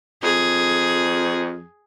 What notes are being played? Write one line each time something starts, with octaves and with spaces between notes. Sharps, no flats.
F2 G#4